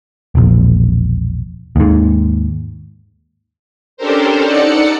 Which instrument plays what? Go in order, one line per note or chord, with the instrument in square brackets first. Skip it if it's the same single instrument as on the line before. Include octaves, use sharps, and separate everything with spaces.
[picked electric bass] E1 A#1
D#2 G#2
[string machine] C#4 D4 G4 A4 A#4 C5
D#4 A4 D5 F#5 C#7